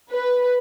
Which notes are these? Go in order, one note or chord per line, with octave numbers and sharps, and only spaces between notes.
B4